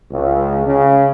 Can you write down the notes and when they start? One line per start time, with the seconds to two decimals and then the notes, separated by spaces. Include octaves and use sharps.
0.11 C#2
0.66 C#3